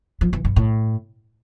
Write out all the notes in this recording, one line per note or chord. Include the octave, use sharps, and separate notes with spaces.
F3
E3
G2
A2